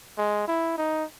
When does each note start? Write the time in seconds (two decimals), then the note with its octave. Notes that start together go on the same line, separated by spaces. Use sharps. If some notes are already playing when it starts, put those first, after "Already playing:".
0.18 G#3
0.48 E4
0.78 D#4